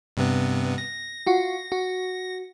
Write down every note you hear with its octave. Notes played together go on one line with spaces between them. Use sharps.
G2 C3 B3
A#6
F4 F#4
F#4